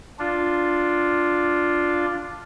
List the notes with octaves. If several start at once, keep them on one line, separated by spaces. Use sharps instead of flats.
D4 F4